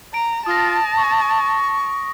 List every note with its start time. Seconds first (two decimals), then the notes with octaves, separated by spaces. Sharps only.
0.14 A#5 D7
0.46 F4 A5 D#6 A#6
0.97 C#6